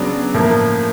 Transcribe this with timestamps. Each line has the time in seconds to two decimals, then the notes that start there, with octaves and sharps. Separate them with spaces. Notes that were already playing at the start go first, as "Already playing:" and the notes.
Already playing: C#3 F#3 B3 D4
0.34 A2 F3 A#3